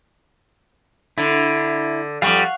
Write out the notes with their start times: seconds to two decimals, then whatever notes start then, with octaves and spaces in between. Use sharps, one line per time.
1.18 D3 E4
2.22 F2 G3 F5 F#5 C#6